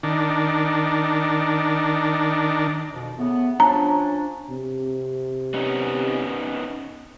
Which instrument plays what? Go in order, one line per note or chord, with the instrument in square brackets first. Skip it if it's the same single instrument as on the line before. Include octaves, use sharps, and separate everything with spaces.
[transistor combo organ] D#3 D4
[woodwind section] F2 B2
C#3 A3 B3
[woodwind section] F3 C#4 D4 [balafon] A#5
[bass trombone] C3
[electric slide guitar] B3 C#4 D#4